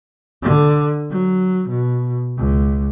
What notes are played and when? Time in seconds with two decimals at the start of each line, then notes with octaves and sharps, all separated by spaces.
0.42 D3
1.11 F#3
1.69 B2
2.38 C#2